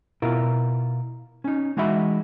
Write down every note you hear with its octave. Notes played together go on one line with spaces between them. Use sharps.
B2 E4 F4 A#4
C#4 D#4
E3 G#3 D#4 F#4 E5 B5